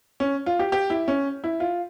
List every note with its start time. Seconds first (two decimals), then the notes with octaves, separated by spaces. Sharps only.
0.20 C#4
0.46 F4
0.59 G4
0.72 G4
0.90 E4
1.08 C#4
1.44 E4
1.60 F4